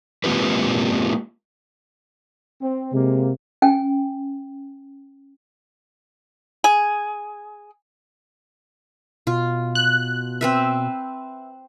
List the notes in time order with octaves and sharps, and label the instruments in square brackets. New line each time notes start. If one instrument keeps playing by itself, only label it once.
[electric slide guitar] G#3 A#3 C4 F4 G4 B4
[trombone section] C4
[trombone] C3 [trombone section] G#3 A#3
[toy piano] C#4 G5 G#5
[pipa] G#4
[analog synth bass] B2 [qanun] F4
[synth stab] F#6
[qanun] C4 B4 E5